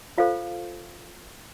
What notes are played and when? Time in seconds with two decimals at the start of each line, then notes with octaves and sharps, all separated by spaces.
0.18 F4 A4 C5 F5